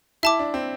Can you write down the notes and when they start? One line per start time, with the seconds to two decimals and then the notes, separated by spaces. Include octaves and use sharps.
0.23 E4 E5 A5 D6
0.39 D4
0.54 C4